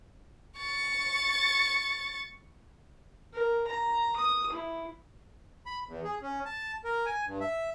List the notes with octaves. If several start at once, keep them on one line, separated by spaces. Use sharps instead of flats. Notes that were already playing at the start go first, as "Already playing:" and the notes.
C#6 A6
A#4
A#5
D#6
E4
B5
E2
G#4
C#4
A5
A#4
G#5
G2
E5